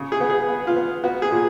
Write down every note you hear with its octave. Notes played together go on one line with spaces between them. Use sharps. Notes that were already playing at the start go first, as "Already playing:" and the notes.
Already playing: C#3
G#4
B3
G#4
B3
F4
B3
B3 F#4
G#4
A#2